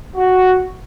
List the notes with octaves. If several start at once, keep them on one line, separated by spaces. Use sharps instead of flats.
F#4